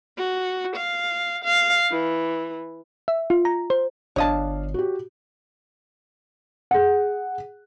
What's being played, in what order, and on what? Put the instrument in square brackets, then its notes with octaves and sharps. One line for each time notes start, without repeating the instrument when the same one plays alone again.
[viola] F#4
F5
F5
E3
[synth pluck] E5
F4
A#5
C5
[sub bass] G1 [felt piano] D4 F5 [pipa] C#5 D#5 A5
[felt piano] F#4 G4
G#4 F#5